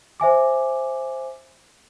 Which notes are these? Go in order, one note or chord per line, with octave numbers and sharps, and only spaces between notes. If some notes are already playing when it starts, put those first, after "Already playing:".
C5 E5 G#5 D6